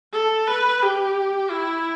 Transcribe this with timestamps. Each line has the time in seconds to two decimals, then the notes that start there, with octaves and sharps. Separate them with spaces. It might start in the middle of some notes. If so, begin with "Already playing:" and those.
0.13 A4
0.47 B4
0.82 G4
1.50 E4